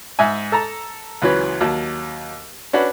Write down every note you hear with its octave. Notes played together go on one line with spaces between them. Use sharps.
G#2 E5 G#5
A4 A5 A#5
C#2 E3 F#3 C#4 B4
D#2 F#3 A5
C#4 D4 F#4 B4